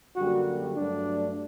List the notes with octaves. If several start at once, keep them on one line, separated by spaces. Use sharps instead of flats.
F#2 D3 G3 A#3 F#4
G2 F#3 A3 D4